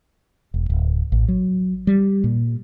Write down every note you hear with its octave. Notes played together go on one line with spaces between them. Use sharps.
E1
D1
A1
F#3
G3
A#2